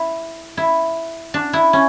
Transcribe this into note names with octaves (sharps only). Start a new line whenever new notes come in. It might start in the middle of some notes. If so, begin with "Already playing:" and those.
Already playing: E4
E4
D4
E4
C#4